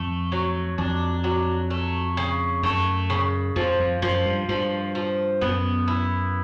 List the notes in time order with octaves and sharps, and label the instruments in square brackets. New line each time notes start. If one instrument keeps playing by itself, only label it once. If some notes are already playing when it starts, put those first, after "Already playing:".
Already playing: [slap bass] F2 [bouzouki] A3
[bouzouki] F#3
[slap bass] F2 [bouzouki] D4
[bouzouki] F#3
A3
C#3
[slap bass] F#2 [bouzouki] A3
[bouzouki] C#3
[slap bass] F2 [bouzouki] F3
[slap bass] F2
[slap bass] F#2 [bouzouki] F3
[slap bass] G2
[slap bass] G2 [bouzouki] F3
[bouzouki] F3
[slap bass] F#2 [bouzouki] B3
[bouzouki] E4